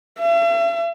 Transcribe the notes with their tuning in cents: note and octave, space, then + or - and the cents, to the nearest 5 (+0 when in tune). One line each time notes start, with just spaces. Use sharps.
E5 +45